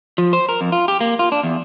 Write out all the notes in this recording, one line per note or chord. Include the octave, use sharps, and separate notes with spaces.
F3
C5
A#4
F2
F4
G4
A#3
F4
D4
E2